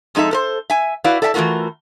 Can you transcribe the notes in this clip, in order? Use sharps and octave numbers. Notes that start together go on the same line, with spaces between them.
F2 G#3 D#4 A4 E5
A4 A#4 C5
E5 G#5
E4 F#4 B4 D5 F5
A4 D5 E5 F5 A5
E3 A3 A#3 F4 F#4 A#4